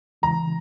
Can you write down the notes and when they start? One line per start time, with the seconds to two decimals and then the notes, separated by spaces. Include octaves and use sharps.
0.22 C#3 E3 G#3 A#5